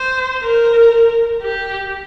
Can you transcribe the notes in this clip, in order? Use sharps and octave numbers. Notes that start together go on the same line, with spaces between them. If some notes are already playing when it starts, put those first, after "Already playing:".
Already playing: C5
A#4
G4